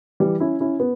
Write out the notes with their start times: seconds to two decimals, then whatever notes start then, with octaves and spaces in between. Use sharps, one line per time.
0.20 E3 G3
0.40 C#4 E4
0.60 C#4 E4
0.80 B3